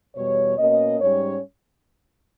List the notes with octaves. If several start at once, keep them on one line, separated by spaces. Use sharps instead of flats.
E2 B2 G3 C#5
B2 A#3 C#4 D#5
G#2 G3 C#4 C#5